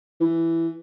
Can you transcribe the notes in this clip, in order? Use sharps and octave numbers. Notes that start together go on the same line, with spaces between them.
E3